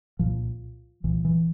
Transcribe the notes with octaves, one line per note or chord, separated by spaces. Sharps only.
C2 A#2 F3
C2 A#2 E3
E3